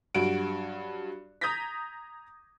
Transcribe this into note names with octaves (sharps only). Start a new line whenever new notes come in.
G2 F#3 F#4 D7
A#5 D#6 G6 G#6 A#6 B6